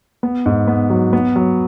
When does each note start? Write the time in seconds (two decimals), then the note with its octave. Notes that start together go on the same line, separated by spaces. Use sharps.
0.23 B3
0.46 G#2
0.68 B3
0.90 F#3
1.13 B3
1.36 F#3